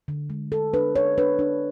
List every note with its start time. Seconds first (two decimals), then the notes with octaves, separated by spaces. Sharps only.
0.08 D3
0.30 G#3
0.52 D3 A4
0.74 D4 B4
0.96 D4 C#5
1.18 D4 B4
1.39 D4